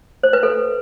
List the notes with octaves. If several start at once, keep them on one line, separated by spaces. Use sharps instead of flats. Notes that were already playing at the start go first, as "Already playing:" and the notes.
C5
B4
A4